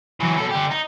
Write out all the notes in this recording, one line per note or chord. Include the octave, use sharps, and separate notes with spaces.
E3 F#3
B2 A4
D3 G4
D#4